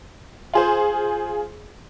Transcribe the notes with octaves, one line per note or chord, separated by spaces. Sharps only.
F4 G#4 C5